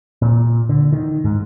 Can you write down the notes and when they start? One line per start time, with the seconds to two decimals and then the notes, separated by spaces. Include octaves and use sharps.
0.22 A#2
0.69 D3
0.93 D#3
1.24 G#2